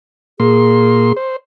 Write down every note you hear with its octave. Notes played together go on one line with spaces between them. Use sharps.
A#2 A#3 G#4 C6
C5